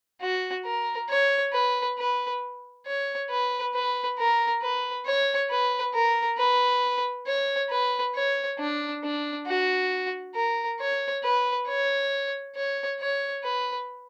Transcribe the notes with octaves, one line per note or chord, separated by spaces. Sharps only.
F#4
A#4
C#5
B4
B4
C#5
B4
B4
A#4
B4
C#5
B4
A#4
B4
C#5
B4
C#5
D4
D4
F#4
A#4
C#5
B4
C#5
C#5
C#5
B4